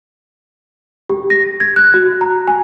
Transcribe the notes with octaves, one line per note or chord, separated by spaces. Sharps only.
G4
A#6
G#6
F#6
F#4
A#5
G#5